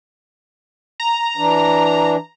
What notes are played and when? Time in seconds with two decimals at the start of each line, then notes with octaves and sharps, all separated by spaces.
1.00 A#5
1.37 E3 D4